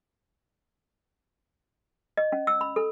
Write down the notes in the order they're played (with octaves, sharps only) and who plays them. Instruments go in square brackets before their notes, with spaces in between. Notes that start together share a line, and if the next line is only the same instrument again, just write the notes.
[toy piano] D#5
C#4
E6
B5
A4